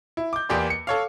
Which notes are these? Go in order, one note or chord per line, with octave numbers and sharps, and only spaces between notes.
E4
D6 G6
E2 A#3 G4 D5 C6
C#7
A4 C#5 F5